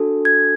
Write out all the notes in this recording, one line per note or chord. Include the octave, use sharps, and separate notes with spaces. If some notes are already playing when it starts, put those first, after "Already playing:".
Already playing: D4 F#4 A4
G#6